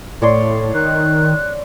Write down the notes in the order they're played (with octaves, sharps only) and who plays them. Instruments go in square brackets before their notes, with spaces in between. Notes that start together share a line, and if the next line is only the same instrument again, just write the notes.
[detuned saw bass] A2 [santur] C#5 D5 C6
[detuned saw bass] D#3 [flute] F#6